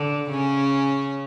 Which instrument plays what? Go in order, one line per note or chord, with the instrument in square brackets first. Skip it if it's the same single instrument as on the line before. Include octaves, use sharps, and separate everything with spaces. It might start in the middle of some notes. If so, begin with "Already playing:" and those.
Already playing: [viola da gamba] D3
C#3 C#4